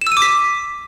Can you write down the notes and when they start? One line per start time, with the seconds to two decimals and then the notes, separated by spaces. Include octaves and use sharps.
0.01 E7
0.07 E6
0.12 D#7
0.17 D6
0.22 B6